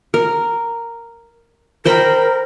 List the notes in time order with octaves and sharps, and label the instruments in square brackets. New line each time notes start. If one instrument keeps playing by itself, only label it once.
[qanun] A#4
[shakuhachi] A#4 [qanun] C5 G5 B5